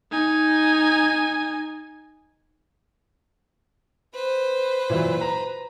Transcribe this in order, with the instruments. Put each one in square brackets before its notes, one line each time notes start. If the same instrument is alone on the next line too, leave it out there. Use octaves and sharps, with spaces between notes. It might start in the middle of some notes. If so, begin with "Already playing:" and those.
[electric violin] D#4 G#5
[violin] B4 C5
[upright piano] A#2 E3 F#3
A#5